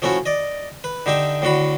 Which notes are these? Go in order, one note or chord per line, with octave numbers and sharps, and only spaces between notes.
F3 A3 C#4 E4 F#4
D5 D#5
B4
D3 D#4 G4 E5
A2 D3 F#4 B5